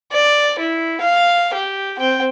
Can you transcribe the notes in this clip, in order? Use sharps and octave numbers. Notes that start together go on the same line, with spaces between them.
D5
E4
F5
G4
C4 G5